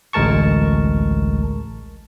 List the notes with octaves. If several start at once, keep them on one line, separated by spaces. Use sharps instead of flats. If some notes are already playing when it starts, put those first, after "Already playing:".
A1 D2 G#3 A#4 A5 C#6